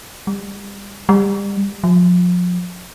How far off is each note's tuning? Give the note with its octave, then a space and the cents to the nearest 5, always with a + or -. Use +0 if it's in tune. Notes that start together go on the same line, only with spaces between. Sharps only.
G3 +35
G3 +30
F3 +35